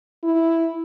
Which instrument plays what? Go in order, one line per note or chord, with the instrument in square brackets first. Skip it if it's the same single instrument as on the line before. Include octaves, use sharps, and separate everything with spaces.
[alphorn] E4